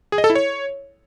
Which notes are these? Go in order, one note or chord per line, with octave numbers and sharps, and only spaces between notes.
G#4
D#5
A4
E4
C#5